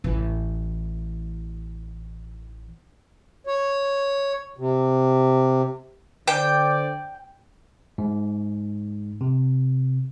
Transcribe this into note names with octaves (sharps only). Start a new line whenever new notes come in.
A1 E3
C#5
C3
D3 C5 D5 G5
G#2
C3